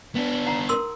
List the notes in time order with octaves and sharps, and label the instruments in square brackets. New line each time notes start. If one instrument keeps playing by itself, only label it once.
[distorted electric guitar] B3 D4
[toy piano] D#4 F#5 A#5
A#4 C6 E6